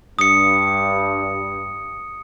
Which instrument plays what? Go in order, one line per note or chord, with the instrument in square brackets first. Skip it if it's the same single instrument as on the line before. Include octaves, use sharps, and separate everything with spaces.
[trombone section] G2 [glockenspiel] D#6 C#7